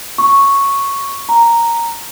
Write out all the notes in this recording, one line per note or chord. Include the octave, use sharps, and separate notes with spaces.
C#6
A#5